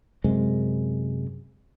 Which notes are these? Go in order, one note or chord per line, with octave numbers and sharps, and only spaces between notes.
F#2 C3 G#3